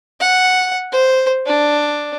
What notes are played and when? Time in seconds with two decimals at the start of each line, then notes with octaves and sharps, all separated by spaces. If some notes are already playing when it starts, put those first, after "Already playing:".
0.20 F#5
0.92 C5
1.46 D4